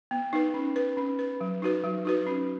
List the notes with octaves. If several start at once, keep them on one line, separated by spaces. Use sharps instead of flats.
B3
D#4 B4
C#4
B4
C#4
B4
F#3
D#4 F#4 B4
F#3
D#4 F#4 B4
C#4